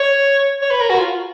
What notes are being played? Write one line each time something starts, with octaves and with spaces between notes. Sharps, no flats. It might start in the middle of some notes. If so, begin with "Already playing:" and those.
Already playing: C#5
C#5
B4
A#4
F#4
F4